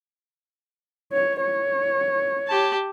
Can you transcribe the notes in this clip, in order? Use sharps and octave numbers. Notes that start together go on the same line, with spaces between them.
C#5
C#5
G4 A5